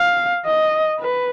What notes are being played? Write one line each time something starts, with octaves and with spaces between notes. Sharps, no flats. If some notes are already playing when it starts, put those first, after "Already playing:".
Already playing: F5
D#5
B4